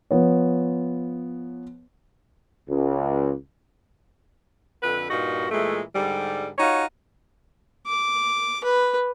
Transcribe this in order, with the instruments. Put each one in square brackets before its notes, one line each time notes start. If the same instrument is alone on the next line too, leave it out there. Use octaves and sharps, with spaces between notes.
[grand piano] F3 B3 C#5
[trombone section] C#2
[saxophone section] F2 D3 B4
G2 A#2 D#4 F#4
A#2 E3 G#3 A3
G#2 D3 G3
D#4 F4 F#4 C#5
[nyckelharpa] D6
B4